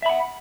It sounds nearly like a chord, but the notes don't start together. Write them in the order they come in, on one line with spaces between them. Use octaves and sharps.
E5 B5 F#5